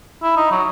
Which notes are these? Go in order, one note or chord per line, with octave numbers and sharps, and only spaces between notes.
E4
D#4
F#3